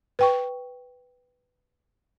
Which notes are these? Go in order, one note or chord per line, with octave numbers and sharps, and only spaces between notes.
B4 G5 C#6